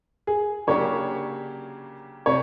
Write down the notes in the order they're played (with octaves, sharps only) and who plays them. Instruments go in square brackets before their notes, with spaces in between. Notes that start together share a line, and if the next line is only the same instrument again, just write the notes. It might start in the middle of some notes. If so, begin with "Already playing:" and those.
[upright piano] G#4
[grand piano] C#3 F#3 A#3 D4 G4 [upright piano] C#5
[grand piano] C3 [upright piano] C#5